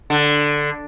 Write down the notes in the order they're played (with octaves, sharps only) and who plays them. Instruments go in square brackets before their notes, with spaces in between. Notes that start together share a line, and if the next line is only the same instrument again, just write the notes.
[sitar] D3